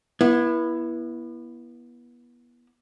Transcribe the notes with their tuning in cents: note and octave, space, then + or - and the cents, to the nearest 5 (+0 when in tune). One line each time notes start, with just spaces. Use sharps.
B3 -30 E4 +10